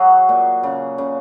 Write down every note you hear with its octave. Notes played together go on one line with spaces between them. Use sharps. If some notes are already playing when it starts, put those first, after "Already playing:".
Already playing: F#3 F#4 G#4
A#2
C#3
C#3